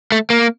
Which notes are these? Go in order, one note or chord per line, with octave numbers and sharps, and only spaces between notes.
A3
A#3